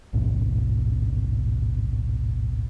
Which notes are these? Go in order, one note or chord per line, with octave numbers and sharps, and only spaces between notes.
A1 D2 G#2 B2